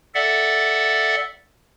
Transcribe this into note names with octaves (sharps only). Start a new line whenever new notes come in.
A4 D5 E5 F#5